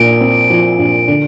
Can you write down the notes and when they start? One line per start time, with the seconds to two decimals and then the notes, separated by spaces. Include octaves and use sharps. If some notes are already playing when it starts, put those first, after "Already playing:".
Already playing: A#1 A#2 D7
0.21 C4
0.50 F3
0.79 A#1
1.08 D3